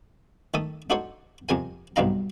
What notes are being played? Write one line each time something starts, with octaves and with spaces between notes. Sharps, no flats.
D#3 A3 A4 D#6
D4 D#4 F#4 A4 C5 C#5
F2 C3 A#4 G#5
B1 G2 C3 D#4 F5 A#5